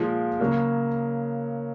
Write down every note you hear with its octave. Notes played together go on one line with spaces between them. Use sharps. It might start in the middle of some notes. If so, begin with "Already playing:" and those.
Already playing: A#2 F3 G#3
C#3 F#3 A#3